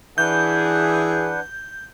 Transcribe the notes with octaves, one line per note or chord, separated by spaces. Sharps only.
E3 D4 G#4 B4 F#5 G6